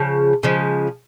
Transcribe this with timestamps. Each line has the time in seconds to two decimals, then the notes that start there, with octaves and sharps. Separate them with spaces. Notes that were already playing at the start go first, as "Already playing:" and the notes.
Already playing: C#3 F3
0.43 C#3 F3 G#3